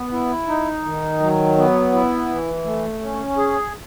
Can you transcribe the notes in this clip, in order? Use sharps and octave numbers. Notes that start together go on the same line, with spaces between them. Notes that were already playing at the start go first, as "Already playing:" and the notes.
Already playing: B3
E4
D#4
D#3
F#3
B3
E4
E3
A3
C#4
G#4